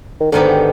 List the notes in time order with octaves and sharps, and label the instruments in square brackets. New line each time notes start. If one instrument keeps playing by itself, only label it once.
[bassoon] D#3
[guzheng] G#2 D#3 B3 D#4 G4 [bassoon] D3